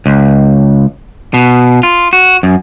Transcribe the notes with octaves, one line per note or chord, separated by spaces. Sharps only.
C#2
B2
F4
F#4
F#2